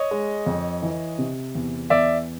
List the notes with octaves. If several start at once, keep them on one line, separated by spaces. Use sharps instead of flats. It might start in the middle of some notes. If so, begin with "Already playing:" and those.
Already playing: C#5 D#5
G#3
F2
E3
C3
E2
E2 D5 E5